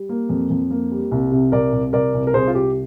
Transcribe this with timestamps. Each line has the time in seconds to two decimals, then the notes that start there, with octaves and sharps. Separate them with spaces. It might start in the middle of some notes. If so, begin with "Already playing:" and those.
Already playing: G3
0.09 A#3
0.29 F2
0.50 F2
0.71 A#3
0.91 G3
1.11 C2
1.32 C3
1.52 C2 A#4 D5
1.73 C2
1.93 C2 A#4 D5
2.14 C2
2.27 A#4
2.34 C2 G#4 C5
2.48 F4
2.55 C3 G4